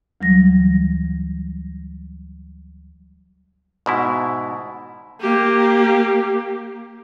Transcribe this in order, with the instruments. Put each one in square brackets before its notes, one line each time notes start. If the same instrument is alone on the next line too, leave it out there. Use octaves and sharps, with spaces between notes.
[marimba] D2 E3 F#3 G3 A#6
[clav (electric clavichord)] G#2 B2 E4
[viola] A#3 G4